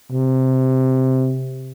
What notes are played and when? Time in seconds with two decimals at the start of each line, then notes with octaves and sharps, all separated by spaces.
0.12 C3